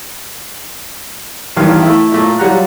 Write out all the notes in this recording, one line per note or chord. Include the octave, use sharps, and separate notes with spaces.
A1 E2 G2 D#3 F4 F5
A3 E4
A#2 A3 A#3
F#3 G3 F4 F#5 A#5 F#6